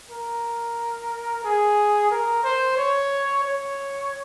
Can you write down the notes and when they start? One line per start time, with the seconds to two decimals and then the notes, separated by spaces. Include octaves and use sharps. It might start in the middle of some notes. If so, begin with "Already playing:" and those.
0.10 A#4
1.44 G#4
2.11 A#4
2.44 C5
2.77 C#5
3.44 C#5